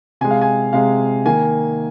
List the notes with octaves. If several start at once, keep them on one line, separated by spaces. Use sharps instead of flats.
C3 G#3 G#5
F5
G#5
C3 G#3 F5
D#3 A#3 G#5